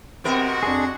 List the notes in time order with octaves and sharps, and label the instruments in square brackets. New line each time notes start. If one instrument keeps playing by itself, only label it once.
[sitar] C3 B3 A#4 [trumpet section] G#3 F#4 [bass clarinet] C4
[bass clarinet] F2 [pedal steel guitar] D4 G#4